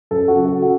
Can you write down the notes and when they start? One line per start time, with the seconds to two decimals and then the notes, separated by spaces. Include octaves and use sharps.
0.11 F#2 A4
0.28 F#4
0.36 C#3 F#3
0.45 A4
0.62 F#4